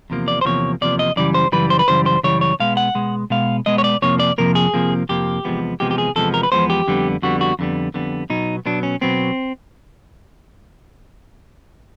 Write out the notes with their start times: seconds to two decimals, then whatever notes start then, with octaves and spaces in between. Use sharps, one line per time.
0.10 E2 C3 F3 A#3
0.28 D5
0.41 C5
0.45 E2 C3 F3 A#3 C#5
0.81 E2 C3 F3 A#3 D5
0.99 D#5
1.16 F#2 C#3 E3 G3 D5
1.34 C5
1.52 F#2 C#3 E3 G3 B4
1.70 C5
1.79 B4
1.88 F#2 C#3 E3 G3 C5
2.06 C5
2.23 F#2 C#3 E3 G3 C#5
2.41 C#5
2.60 B2 G#3 B3 F5
2.77 F#5
2.95 B2 G#3 B3
3.30 B2 G#3 B3 F5
3.66 B2 G#3 B3 D#5
3.78 C#5
3.84 D5
4.02 F2 C3 F3 A#3 C#5
4.19 D5
4.38 F2 C3 F3 A#3 A#4
4.55 G#4
4.74 F2 C3 F3 A#3
5.09 F2 C3 F3 A#3 G4
5.45 E2 C3 F3 G#3 B3
5.80 E2 C3 F3 G#3 B3 G4
5.91 G4
5.98 G#4
6.16 E2 C3 F3 G#3 B3 A4
6.34 A#4
6.43 B4
6.52 E2 C3 F3 G#3 B3 C5
6.70 G4
6.87 F2 D3 G3 B3
7.22 F2 D3 G3 B3 F#4
7.41 F#4
7.59 F2 D3 G3 B3
7.94 F2 D3 G3 B3
8.30 B2 F#3 B3 D#4
8.66 B2 F#3 B3 D4
8.83 C#4
9.01 B2 F#3 B3 C4